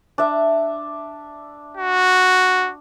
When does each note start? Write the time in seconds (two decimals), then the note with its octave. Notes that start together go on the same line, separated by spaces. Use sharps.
0.18 D4 E5
1.77 F#4